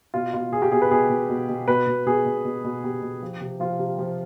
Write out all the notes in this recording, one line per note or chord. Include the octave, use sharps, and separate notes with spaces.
B2 F4
B2 F4
B2 G#4
G4
B2 G#4
B4
B2 G#4
B2
B2
B2
B2 B4
B2
B2 G#4
B2
B2
B2
B2 G4
B2
F3
C3
F3 F4
C3
F3